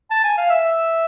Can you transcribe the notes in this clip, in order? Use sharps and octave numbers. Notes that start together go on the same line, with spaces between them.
A5
G#5
F5
E5